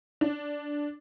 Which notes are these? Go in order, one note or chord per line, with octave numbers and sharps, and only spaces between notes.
D4